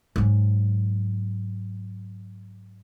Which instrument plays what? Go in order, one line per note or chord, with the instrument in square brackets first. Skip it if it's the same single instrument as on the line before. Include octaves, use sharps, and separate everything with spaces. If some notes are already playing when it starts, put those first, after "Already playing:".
[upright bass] G#2 F#3